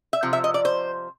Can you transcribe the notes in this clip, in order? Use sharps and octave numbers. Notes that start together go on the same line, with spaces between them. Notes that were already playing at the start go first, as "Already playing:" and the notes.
E5
C3 F3
E5
D#5
D5
C5